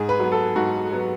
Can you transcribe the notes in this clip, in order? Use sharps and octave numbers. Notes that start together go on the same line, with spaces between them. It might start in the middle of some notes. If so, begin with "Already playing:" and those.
Already playing: G#2 G#4
B4
F#3 B3
A4
G#2 F#4
F#3 B3